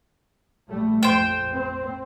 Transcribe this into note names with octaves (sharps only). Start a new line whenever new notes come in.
A#1 G3 A3
A#1 F2 C5 G5
C4